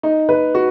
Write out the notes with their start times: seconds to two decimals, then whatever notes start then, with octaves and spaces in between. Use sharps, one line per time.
0.03 D#4
0.29 B4
0.55 F#4